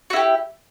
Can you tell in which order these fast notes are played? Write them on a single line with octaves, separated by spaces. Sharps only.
F#4 E4 G4